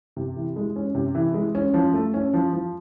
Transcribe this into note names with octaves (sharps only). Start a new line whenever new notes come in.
C3
E3
G#3
C#4
C3
E3
G#3
C#4
F3
A3
C#4
F3
F3